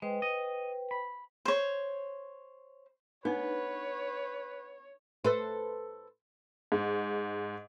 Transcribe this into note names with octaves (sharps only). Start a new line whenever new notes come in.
G#3 B4 C5 G5
D#5
B5
C5 C#5
B3 D4 D#4 B4 C#5
A4 B4 C5
G#2